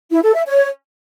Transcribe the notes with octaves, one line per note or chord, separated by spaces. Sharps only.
E4
A4
E5
C#5